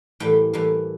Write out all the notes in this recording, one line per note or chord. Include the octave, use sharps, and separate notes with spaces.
A2 E3 G3 A#3 G5
A2 E3 G3 A#3